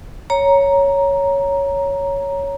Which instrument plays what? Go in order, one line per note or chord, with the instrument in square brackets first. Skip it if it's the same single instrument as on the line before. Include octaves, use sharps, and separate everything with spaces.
[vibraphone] C#5 A#5